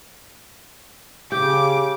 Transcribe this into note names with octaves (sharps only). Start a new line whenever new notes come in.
C#3 G4 D6